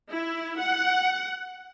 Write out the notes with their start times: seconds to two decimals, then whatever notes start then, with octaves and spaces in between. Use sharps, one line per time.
0.11 E4
0.59 F#5